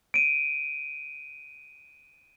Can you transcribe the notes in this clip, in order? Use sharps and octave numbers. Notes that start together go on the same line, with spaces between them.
D7 D#7